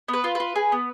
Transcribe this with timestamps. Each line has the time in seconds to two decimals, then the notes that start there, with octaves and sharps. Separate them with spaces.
0.08 B3
0.13 B4
0.24 F4
0.35 F4 B4
0.56 G#4
0.72 B3